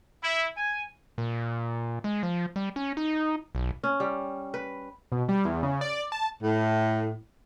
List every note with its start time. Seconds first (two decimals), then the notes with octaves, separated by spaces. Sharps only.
0.22 E4
0.56 G#5
1.18 A#2
2.04 G#3
2.23 F3
2.56 G3
2.76 C#4
2.97 D#4
3.55 B1
3.84 C#4
4.00 G3
4.54 B4
5.12 B2
5.29 G3
5.45 E2
5.63 C#3
5.81 D5
6.12 A5
6.42 A2